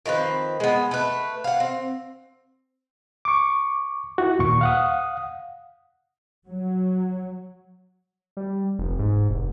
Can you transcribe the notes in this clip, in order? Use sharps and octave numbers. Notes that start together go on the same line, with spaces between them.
D#3 F3 C4 B4
G#3 B3
A3 B4
F5 F#5
C4
C#6 D6
E4 F#4
D#2 A#2 C#6
F5 F#5 D#6
F#3
G3
F1
G#2
F1